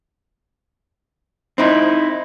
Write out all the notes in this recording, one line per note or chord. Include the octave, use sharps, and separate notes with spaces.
C4 D#4 E4